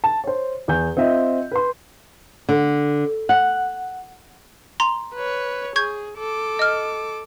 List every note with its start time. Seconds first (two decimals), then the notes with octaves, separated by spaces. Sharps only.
0.04 A5
0.24 C5 C#5
0.68 E2 G#5 G6
0.97 C4 F4 D#5 E5
1.52 B4 C6
2.49 D3
3.29 F#5
4.80 A#5 C6
5.15 B4 C#5
5.76 G#4 C#6 G6 G#6
6.18 A4 D6
6.59 D#5 F6